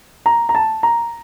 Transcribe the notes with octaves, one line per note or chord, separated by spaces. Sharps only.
A#5
A#5
A5
A#5